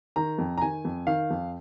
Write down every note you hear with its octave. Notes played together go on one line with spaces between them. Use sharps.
D#3 A#5
F2
A#5
D#3 G#5
F2
D#3 F5
F2